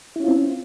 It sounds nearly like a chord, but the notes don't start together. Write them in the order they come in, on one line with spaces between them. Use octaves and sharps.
E4 C#4 F4 C4